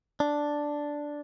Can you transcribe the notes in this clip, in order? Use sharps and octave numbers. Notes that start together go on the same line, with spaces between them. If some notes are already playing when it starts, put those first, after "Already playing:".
D4